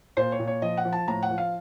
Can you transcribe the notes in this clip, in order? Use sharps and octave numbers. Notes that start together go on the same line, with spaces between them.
A#2 C5
C#5
A#2
C#5
F3 D#5
F#5
F3
A5
A2 A#5
F#5
F3
F5